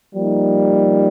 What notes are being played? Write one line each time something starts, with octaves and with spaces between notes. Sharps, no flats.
F3 G3 A#3 D#4